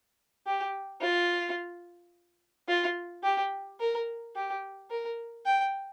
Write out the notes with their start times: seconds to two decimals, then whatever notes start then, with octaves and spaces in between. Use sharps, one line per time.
0.47 G4
1.01 F4
2.69 F4
3.23 G4
3.80 A#4
4.36 G4
4.90 A#4
5.46 G5